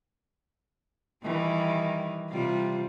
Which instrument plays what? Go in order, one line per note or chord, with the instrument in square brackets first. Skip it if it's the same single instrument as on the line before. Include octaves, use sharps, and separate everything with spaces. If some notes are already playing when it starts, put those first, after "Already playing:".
[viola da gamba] D#3 E3 G3
C3 G3 F4